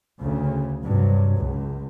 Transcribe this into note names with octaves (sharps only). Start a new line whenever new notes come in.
D2 C#3
G2 C3 F#3
C#2